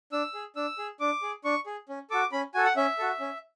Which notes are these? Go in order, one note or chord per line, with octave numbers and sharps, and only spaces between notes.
D4 E6
G#4
D4 E6
G#4
D4 D6
G#4
D4 C#6
G#4
C#4
F#4 A4 D6
C#4 B5
F#4 A4 G#5
F#5
C#4 E5
F#4 A4
C#4